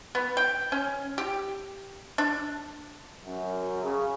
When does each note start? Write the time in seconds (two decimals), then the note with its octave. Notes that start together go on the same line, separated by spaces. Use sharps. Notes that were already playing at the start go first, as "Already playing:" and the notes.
0.15 B3
0.37 G5
0.72 C#4
1.18 G4
2.18 D4
3.24 F#2
3.82 C#3